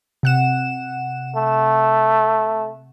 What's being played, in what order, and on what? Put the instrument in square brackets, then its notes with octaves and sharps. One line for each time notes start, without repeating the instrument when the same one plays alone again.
[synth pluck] C3 F#5 E7
[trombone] A3